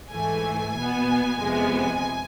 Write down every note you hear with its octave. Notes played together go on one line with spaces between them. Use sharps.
G#2 E3 A3 G#5
B2 B3
F2 C3 G#3 B3